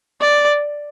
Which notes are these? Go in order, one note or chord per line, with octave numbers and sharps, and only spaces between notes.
D5